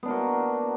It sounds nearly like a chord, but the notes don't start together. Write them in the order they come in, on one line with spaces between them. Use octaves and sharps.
B3 D4 A#3 F#4